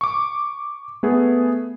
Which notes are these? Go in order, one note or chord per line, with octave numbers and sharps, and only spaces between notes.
C#6 D6
A3 B3 G#4